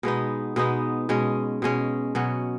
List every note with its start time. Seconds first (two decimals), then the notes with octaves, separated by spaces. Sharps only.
0.03 B2 G#3 B3 D#4
0.56 B2 G#3 B3 D#4
1.09 B2 G#3 C#4
1.62 B2 G#3 C#4
2.15 B2 F#3 C#4